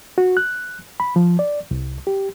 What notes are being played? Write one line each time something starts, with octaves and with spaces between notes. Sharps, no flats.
F#4
F#6
B5
F3
D5
C2
G4